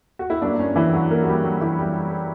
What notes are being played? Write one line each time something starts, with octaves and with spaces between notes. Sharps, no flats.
F#4
E4
G2 F#3 A#3 D4
C#4
E3 E4
F#3 F#4
A#3 A#4
F#4
G3 G4
F#3 F#4
E3 E4
G3 G4